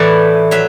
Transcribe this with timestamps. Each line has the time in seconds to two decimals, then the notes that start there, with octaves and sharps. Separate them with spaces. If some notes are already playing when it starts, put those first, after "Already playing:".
Already playing: A2 E3 A3 E4 A4 B4 D5
0.51 F#3 E5